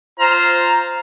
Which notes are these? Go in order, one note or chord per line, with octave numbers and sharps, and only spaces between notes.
F4 C5 A#5